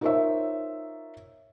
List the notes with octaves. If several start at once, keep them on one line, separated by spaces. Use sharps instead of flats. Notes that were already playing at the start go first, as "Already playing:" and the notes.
D#4 F4 A#4 C5 C#5 E5